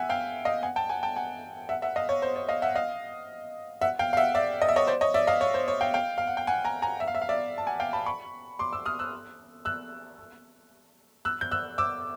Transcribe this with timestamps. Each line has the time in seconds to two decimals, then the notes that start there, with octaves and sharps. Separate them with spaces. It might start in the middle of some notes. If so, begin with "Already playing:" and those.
Already playing: E5 F#5 G#5
0.10 F5 G5
0.45 D#5 F5
0.63 F#5 G#5
0.76 G5 A5
0.90 F#5 G#5
1.03 G5 A5
1.16 F#5 G#5
1.69 E5 F#5
1.82 E5 F#5
1.96 D#5 F5
2.09 C#5
2.22 C5
2.36 C#5
2.49 D#5 F5
2.62 E5 F#5
2.75 D#5 F5
3.81 E5 F#5
3.99 F5 G5
4.13 F5
4.17 E5 F#5
4.35 D5 E5
4.62 D#5
4.69 E5
4.76 C#5 D#5
4.87 C5 D5
5.01 C#5 D#5
5.14 D5 E5
5.27 D#5 F5
5.41 C#5
5.54 C5
5.68 C#5
5.81 F5 G5
5.94 F5 G5
6.18 F5
6.27 F#5
6.37 G5
6.47 F#5 G#5
6.64 G#5 A#5
6.82 G#5 A#5
7.00 E5
7.08 F5
7.15 E5
7.22 F5
7.29 D5 E5
7.58 A5
7.67 F#5 G#5
7.80 F5 G5
7.93 A5 B5
8.06 B5 C#6
8.59 C6 D6
8.73 D6 E6
8.86 D#6 F6
8.99 E6 F#6
9.65 E6 F#6
11.25 E6 F#6
11.41 G6
11.51 E6 F#6
11.78 D6 E6